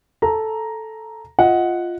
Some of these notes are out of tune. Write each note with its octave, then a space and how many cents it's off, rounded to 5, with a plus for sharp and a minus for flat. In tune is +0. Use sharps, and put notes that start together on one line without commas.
A4 -5 A#5 +0
F4 +0 D#5 +20 F#5 +0